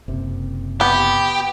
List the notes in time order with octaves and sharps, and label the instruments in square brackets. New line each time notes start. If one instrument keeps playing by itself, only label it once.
[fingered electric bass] F#1 C3
[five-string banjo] B3 [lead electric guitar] G4